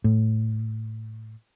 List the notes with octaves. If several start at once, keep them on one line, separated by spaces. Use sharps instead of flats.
A2